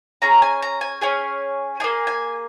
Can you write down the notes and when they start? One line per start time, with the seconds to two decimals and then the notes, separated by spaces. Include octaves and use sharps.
0.22 C#4 G#4 A#5
0.42 G#5
0.62 A#5
0.81 G#5
1.01 C#4 G#4 G#5
1.80 D#4 G#4 G#5
1.84 A#3
2.07 G#5